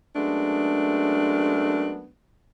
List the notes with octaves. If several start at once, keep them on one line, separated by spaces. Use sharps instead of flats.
F#2 G#3 A3 B3 D4